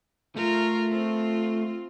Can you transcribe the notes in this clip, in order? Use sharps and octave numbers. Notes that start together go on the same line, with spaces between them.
A3 F4 A#4
C4 F4